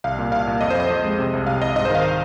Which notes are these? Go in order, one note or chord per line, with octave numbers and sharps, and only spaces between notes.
C2 F5
A#2
C2 F5
A#2
F2 D#5
C5
F2 D#5
F2
G#3
C3
C2
C3 F5
C2 D#5
G#2 D#5
C5
D#3 F5